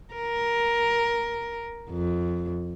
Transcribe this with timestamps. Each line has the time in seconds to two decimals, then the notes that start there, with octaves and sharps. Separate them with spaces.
0.14 A#4
1.90 F2